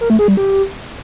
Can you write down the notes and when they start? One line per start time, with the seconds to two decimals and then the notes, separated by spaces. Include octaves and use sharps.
0.01 A#4
0.10 A3
0.19 G#4
0.28 G3
0.37 G4